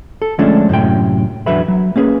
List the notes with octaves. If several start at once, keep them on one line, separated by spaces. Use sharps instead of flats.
A4
D3 F3 G#3 A3 C#4 D4
F#2 A2 C3 G5
E2 D3 F#3 B4 E5 B5
F#3
A#3 C#4 G#4 B4